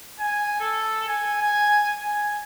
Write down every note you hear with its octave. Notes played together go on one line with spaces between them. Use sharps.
G#5
A4
G#5
G#5
G#5